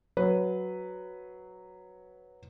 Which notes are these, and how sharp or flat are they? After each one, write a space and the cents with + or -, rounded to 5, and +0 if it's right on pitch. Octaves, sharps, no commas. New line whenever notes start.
F#3 +0 B4 +0